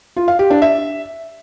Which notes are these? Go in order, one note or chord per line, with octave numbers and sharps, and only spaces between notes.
F4
F5
G4
D4
E5